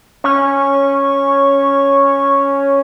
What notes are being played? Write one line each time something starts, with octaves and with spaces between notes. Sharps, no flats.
C#4 C#6